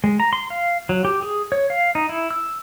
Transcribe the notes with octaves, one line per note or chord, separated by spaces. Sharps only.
G#3
A#5
C6
F5
F#3
G4
G#4
C#5
F5
D#4
E4
E6